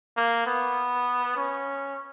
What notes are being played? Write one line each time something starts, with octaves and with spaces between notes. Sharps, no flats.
A#3
B3
C#4